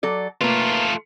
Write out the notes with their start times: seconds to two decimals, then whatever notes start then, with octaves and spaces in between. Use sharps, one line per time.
0.03 F#3 A4 D5
0.41 A3 A#3 F4 B4